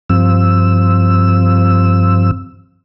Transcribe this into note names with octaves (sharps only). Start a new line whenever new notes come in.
G2 F3 C4 E6